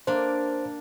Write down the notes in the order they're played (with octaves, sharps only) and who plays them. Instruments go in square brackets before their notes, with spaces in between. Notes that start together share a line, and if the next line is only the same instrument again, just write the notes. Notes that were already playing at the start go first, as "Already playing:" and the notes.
[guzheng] A#3 D4 [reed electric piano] C5